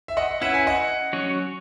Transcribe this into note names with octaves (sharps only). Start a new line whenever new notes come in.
E5
D#5 F#5
C#4 E4 B4 E5 F#5
G#5
D#5 F#5
F#3 C#4 F#4 C#5